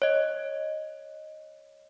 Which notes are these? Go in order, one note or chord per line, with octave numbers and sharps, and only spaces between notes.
C#5 D#5